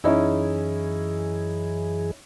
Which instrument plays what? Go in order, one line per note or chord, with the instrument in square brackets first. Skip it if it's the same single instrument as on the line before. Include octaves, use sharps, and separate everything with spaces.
[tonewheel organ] F#2 E3 G#4 [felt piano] C#4 D#4 E4